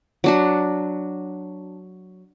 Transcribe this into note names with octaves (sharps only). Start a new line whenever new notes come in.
F#3 D4 F#4